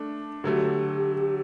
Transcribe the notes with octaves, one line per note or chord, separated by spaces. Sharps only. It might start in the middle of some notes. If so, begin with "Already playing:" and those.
Already playing: A3 D4
D3 F#3 A3 G4